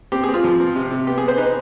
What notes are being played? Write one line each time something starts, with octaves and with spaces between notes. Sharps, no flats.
C4 G4
G#4
C4
F4
F3
C4
C3
C3
B3 G4
B3 G#4
C5
D#4 B4